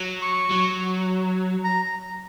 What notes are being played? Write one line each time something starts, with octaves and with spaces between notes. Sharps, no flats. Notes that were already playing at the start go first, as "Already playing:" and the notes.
Already playing: F#3
C#6
F#3
A#5